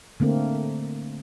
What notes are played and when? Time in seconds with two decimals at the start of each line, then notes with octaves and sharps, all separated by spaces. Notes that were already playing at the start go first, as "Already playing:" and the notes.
0.20 D3 A3 A#3 C4